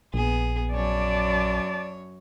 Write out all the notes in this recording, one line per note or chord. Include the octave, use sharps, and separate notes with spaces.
A#1 B3 G#4
F#2 C#5 D5 A5